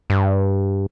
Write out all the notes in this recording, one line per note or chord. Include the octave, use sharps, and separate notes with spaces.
G2